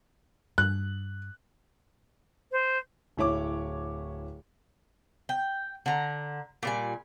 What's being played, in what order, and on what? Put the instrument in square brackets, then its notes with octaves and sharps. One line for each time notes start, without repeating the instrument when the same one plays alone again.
[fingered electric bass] G2 [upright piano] F#6
[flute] C5
[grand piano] D1 E4 C#5 D6
[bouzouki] G5
D3 A#5
A#2 G3 G#5